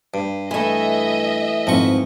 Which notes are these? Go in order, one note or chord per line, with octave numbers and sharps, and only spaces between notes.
G2
E3 A3 D#5 E5
G#1 F2 F3 C#6